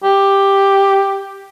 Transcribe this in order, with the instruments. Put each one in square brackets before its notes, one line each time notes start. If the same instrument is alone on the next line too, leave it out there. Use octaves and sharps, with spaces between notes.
[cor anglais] G4